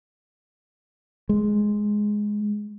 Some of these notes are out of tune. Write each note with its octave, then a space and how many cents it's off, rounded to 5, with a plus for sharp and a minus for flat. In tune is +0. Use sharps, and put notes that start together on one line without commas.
G#3 +5